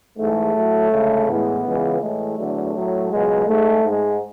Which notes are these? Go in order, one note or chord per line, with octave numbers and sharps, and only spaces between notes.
G#2 E3 G#3 A3
A2 F#3
D2 C#3 G#3
A2 E3 G#3 B3
C#2 C#3 E3 G#3
A2 E3 G#3 A3
E2 D3 F#3
A2 F#3
C#2 B2 F#3 G#3
G#2 G#3 A3
G#2 G#3